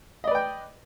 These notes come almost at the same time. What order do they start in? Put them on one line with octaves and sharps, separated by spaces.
D#5 D5 B4 G5